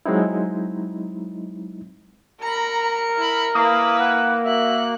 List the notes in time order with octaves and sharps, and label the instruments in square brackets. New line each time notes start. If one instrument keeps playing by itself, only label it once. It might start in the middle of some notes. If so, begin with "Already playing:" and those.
[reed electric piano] F#3 G#3 C4 D#4 E4
[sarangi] A#4 [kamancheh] A#5 B5 [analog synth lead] C#7
[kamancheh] E4 B5
[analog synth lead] A#3 [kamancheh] E4 B4 [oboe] D#6
[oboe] F#5
[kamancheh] F#4 F#6 [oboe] E5